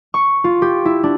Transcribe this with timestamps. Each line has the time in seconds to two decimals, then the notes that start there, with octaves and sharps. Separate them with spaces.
0.14 C#6
0.44 F4
0.62 G4
0.85 E4
1.04 D4